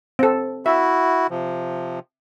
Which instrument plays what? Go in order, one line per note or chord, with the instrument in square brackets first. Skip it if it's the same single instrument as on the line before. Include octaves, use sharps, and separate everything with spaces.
[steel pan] C4 A4
[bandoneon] E4 F#4 [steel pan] E5
[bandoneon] C3 F3